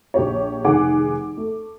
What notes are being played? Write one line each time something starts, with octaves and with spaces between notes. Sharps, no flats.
A#1 G4 C#5
F1 D#3 G#4 F#5 D6
A3